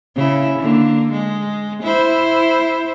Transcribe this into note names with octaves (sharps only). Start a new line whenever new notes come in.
C#3 C#4 E4
D3 A#3
G#3
E4 C5